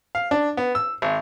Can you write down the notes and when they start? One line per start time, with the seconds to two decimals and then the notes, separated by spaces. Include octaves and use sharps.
0.15 F5
0.31 D4
0.57 B3
0.75 E6
1.02 G#1